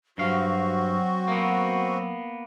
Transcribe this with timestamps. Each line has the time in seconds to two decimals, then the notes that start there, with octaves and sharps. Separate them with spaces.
0.18 G2 F#3 C4 F#4 F5
1.28 A#3 B3